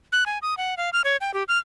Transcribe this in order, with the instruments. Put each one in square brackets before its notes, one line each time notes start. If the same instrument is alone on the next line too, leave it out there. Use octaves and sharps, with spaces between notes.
[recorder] F#6
G#5
D#6
F#5
F5
F6
C#5
G5
G4
F6